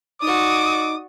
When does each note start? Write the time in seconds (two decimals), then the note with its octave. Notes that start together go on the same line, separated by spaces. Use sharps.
0.22 D#4 F#4 D5 D6 D#6